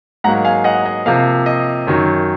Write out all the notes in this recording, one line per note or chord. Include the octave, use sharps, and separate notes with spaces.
G#2 F#3 A#3 F#5 A#5
F5 G#5
D#5 F#5
D#5
C3 F3 A#3 F5
D#5
F#2 D#3 F#3